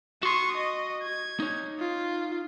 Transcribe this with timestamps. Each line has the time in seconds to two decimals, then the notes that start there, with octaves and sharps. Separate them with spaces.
0.23 F#4 C6 C#6 D#6
0.57 D#5
1.03 G#6
1.40 D#4 C#5
1.80 F4